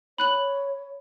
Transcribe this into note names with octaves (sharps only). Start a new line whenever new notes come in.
C#5 B5 F#6 F#7